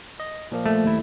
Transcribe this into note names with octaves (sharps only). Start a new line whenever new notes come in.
D#5
A#2 F3 A#3
A3
D#2 E4